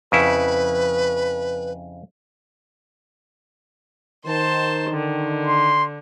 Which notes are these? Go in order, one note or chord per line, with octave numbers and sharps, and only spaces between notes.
F2 C#3 E4 B4
D#3 C5 A5 C6
D3
C6